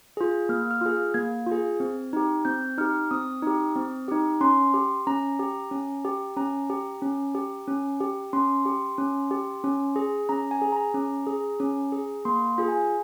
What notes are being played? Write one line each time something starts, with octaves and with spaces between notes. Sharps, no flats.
F4 G#4
A#3 F6
F6
F4 G#4
A#3 G#6
F4
G#4
C4
D#4 G4
C4 G6
D#4 G4 F6
C4 D#6
D#4 G4
C4
D#4 G4
C#4 C6
G4
C#4 A#5
G4
C#4
G4
C#4 A#5
G4
C#4
G4
C#4
G4
C#4 C6
G4
C#4
G4
C#4
G#4
C#4 A#5
G#5
G#4
A#5
C#4
G#4
C#4
G#4
A#3 C6
F4 G#4
G#5